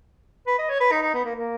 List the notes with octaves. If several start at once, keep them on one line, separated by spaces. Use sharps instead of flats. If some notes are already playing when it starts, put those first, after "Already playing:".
B4
D#5
C#5
B4
D#4
D#4
B3
A#3
A#3